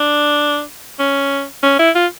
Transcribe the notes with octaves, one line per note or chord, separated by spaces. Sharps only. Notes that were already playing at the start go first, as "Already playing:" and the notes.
Already playing: D4
C#4
C#4
E4
F4